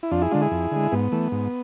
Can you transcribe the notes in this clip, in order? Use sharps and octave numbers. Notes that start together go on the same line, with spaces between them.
E4
F2 D4 F4
E4 G#4
D3 G#3 D4 F4
E4 G#4
F2
D3 G#3
G#2 B3
E3 A3
G#2